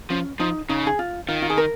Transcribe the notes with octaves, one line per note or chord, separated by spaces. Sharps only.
F3 C#4
F3 D#4
C#3 D#4
G#4
F4
D#3 F4
F4
G#4
A#4